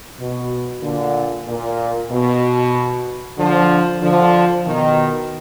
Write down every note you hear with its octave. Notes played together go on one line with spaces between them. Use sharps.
B2
A#2 D3
A#2
B2
D3 F3
D3 F3
B2 D#3